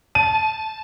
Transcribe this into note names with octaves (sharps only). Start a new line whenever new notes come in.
A5 D#7